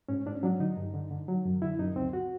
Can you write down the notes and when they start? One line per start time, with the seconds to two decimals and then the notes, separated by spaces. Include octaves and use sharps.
0.09 G#2 C#4
0.26 G#2 D4
0.35 C#4
0.43 F#3 D4
0.60 D3 D#4
0.77 G2
0.94 D3
1.11 D3
1.28 F#3
1.45 F#2
1.62 D3 E4
1.79 F#2 D#4
1.96 C#2 C4
2.13 F#4